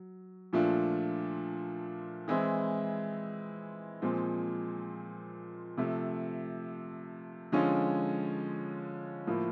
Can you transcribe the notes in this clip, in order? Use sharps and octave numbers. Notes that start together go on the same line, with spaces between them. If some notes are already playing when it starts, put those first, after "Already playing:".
Already playing: F#3
A#2 F3 A3 D4 F4
E3 G#3 C4 E4
A#2 F3 G#3 C4
C3 F3 A3
D3 F3 G#3 C#4 F4
A2 F3 A#3